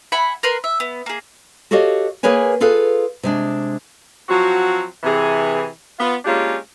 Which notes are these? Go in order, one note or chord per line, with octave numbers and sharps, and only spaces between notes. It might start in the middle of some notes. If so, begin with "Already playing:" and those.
E5 F#5 G#5 B5
A#4 B4 C6
E5
B3
A#3 G#4
F#4 G4 A4 C#5 D#5 F5
A#3 G#4 A#4 B4 C#5 G#5
F4 G#4 A4 B4 F5
C3 G#3 D4
F3 F#3 C4 F#4
C3 E3 G#4
B3 F4
G#3 A#3 C#4 D4 F4 G4